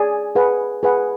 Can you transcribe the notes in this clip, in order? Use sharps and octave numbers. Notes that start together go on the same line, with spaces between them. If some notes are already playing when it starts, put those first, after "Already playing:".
Already playing: G#4 D5 G#5
G#4 B4 F#5
G#4 B4 F#5